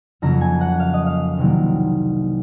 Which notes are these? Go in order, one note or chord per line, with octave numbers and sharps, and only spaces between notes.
F2 C#3 F#3 A#3 A#5
G#5
F#5
F5
D#5
F5
C2 C3 D#3 F#3 A#3